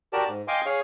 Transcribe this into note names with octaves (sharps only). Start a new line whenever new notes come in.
F#4 G4 A#4 D5 A5
G#2
D#5 F5 G5 G#5 C6 D6
G#4 C#5 F5